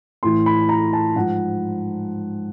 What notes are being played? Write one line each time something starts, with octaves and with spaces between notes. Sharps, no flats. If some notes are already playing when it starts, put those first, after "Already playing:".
A2 E3 C6
B5
A#5
A5
G#2 F3 F#5